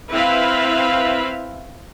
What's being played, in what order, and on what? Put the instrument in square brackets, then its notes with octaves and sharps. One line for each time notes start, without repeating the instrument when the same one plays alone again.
[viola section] C4 E4 B4 E5 F5